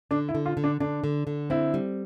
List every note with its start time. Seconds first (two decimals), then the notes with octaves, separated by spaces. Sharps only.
0.11 D3 D4
0.29 E4
0.35 D3
0.46 F4
0.57 D3
0.64 D4
0.80 D3 D4
1.04 D3
1.27 D3
1.50 C4 E4
1.74 G3